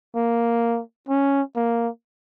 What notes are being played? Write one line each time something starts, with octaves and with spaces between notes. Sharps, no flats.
A#3
C#4
A#3